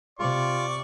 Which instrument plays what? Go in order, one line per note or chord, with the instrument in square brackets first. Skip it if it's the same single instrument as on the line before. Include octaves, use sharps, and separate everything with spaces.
[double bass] C3 [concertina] F4 [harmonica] D5 C#6 D6